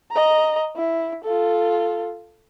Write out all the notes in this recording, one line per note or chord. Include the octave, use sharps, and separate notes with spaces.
D#5 A#5
E4
F4 A4